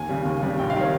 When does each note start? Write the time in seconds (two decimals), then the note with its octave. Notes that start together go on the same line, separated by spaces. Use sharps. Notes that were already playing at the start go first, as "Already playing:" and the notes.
Already playing: D#2 G#5
0.09 C#3 G3
0.25 D#2
0.42 C#3 G3
0.59 A#1 G5
0.70 F5
0.76 D#3 G3
0.81 C#5